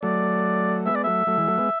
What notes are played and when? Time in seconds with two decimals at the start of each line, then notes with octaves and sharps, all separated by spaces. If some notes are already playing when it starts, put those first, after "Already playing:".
0.03 F#3 A3 D5
0.86 G#3 B3 E5
0.95 D5
1.04 F#3 A3 E5
1.27 F#3 A3
1.38 E3 G#3
1.48 F#3 A3
1.58 G#3 B3